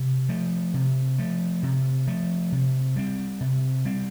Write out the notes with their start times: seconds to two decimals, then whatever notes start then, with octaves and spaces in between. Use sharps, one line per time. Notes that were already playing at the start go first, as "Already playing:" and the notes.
Already playing: C3
0.29 F3 A3
0.74 C3
1.18 F3 A3
1.63 C3
2.07 F3 A3
2.52 C3
2.96 G3 C4
3.41 C3
3.85 G3 C4